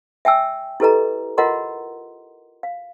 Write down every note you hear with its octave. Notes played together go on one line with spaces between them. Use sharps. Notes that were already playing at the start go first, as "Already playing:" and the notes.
E5 G5 G#5 E6
E4 G4 A4 B4 D#5 A#5
F4 A#4 D#5 F#5 A#5 C6
F5